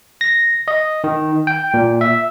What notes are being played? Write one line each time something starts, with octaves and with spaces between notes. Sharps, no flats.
A#6
D#5
D#3
G5
A#2
E5